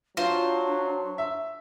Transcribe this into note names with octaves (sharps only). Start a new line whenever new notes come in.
F#3 D4 F4 C5
E5